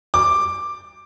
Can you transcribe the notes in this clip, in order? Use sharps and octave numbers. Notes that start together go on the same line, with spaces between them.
D6